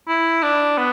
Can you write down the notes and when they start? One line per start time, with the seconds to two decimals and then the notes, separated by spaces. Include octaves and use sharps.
0.08 E4
0.43 D4
0.78 B3